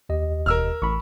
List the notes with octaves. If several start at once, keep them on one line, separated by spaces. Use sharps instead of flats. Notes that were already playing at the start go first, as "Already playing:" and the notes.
D#2 G4 D#5
E1 A#4 E6 F6
A1 B5 C#6